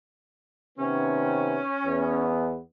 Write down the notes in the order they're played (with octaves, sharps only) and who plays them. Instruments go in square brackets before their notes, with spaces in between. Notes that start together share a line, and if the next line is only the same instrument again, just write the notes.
[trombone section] C3 D#3 B3 [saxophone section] C#4
[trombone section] E2 B3